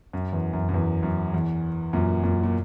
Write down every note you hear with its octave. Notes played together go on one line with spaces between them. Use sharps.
F#2
E2
F#2
F#2
E2
F#2
E2
F#2 A#2
F#2 A#2
A#2